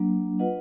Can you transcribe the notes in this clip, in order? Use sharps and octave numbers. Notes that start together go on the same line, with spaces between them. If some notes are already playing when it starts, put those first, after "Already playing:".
Already playing: F#3 A#3 D4
F4 B4 D#5 F#5